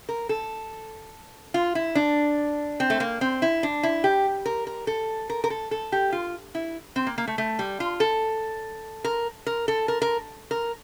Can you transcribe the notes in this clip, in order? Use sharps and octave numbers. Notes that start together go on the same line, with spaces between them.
A#4
A4
F4
E4
D4
C4
A3
A#3
C4
E4
D4
E4
G4
A#4
A#4
A4
A#4
A#4
A4
A4
G4
F4
E4
C4
A#3
A#3
A3
A3
G3
F4
A4
A#4
A#4
A4
A#4
A#4
A#4